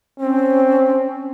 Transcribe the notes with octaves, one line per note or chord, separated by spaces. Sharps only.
C4 C#4